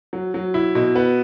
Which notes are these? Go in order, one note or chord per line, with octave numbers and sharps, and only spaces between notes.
F#3
F#3
E4
B2
B3